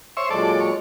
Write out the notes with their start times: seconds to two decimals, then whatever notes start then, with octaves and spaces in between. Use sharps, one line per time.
0.17 C5 C#5 E5
0.30 A#2 F#3 G#3 A4 D5
0.60 C#5